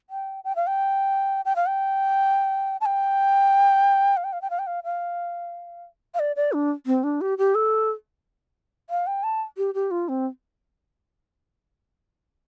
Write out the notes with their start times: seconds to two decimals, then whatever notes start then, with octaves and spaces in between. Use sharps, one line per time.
0.10 G5
0.44 G5
0.56 F5
0.67 G5
1.45 G5
1.56 F5
1.67 G5
2.81 A5
2.86 G5
4.17 F5
4.24 G5
4.33 F5
4.42 G5
4.50 F5
4.59 G5
4.67 F5
4.84 F5
6.14 F5
6.19 D5
6.36 D5
6.53 D4
6.87 C4
7.04 D4
7.21 G4
7.38 G4
7.55 A4
8.90 F5
9.07 G5
9.24 A5
9.57 G4
9.74 G4
9.91 F4
10.09 C4